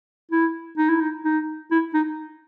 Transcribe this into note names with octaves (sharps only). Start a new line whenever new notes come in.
E4
D#4
E4
D#4
D#4
E4
D#4